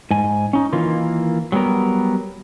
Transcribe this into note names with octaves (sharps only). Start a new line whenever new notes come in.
G#2 G#5
C#4 D#4
D#3 E3 A#3 F4
F#3 G3 A#3 B3 A#4